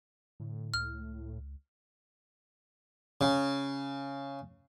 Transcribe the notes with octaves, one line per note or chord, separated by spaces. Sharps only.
A2 D3
C#2 F6
C#3